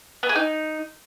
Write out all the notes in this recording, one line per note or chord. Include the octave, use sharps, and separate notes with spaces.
B3
G#4
D#4